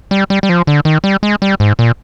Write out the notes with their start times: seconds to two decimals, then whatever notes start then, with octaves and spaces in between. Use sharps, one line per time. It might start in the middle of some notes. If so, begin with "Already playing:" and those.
0.11 G3
0.30 G3
0.43 G3
0.49 F3
0.67 D3
0.85 D#3
1.04 G3
1.23 G#3
1.42 G3
1.60 G#2
1.79 A#2